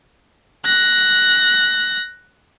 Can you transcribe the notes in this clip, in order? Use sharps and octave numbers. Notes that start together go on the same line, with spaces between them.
F#6 A#6